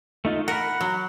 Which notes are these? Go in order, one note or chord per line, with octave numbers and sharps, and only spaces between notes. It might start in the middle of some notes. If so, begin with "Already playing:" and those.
A3 D#4 F4
A#4 F#5 B5
F#3